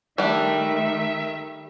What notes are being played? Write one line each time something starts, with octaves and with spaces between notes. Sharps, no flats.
D#3 G3 A3 D4 E5